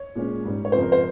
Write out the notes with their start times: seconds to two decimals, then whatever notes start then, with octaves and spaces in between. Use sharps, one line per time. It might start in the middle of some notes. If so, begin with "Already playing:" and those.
Already playing: C#5
0.15 A#2 G#3 C#4
0.44 G#2 G3 C#4
0.65 C#5
0.72 F2 C#3 F3 C4 C5
0.82 A#4
0.92 C5